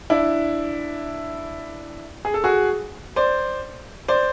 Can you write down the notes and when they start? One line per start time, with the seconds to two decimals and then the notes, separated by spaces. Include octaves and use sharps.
0.10 D4 E4
2.25 G#4
2.34 A4
2.44 F#4 G#4
3.16 C5 D5
4.08 C5 D5